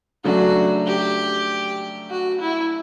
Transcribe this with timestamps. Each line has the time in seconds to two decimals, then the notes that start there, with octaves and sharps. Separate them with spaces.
0.24 C#3 F#3 A3 D4 F#4
0.86 G4
2.10 F#4
2.41 E4